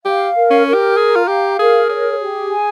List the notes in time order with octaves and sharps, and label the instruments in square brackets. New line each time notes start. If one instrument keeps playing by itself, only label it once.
[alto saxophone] G4 [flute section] F5
[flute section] A#4
[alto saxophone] C#4
[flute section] A#4
[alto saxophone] G4
[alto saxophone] G#4 [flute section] A#5
[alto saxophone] F4
[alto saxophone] G4 [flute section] F5
[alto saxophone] G#4 [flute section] A#4
[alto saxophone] G#4 [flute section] C#5
[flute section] G4
G#5